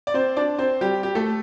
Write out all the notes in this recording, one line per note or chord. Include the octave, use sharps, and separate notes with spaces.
D5
C4 C5
D4 D5
C4 C5
G3 G4
G4
A3 A4